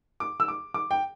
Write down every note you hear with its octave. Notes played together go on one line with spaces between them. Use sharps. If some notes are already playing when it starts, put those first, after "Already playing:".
D6
E6
D6
D6
G5